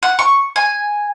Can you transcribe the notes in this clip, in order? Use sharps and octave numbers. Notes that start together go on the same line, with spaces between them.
F#5
C#6
G#5